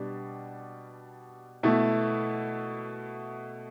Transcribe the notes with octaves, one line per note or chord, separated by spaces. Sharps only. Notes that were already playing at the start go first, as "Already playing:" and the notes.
Already playing: B2 G3 D4 G4
B2 A3 E4